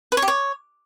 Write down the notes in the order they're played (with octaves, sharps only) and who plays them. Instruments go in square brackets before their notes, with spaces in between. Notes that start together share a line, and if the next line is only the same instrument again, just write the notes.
[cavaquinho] B4
C#5
G4
C#5